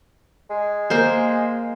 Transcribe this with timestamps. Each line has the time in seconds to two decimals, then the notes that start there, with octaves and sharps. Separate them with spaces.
0.50 G#3
0.90 A#3 A#4 C5